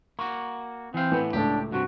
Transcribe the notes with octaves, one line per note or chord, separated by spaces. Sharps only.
A#3 F#4 C#6
E3 C4 F5
A2 E3 B3 B4
C#2 A2 D4 G4 A4
G2 C3 F#4